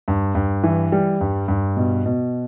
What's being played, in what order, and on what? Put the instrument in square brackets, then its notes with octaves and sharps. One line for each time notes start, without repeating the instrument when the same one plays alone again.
[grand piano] G2
G2
E3
G3
G2
G2
B2
B2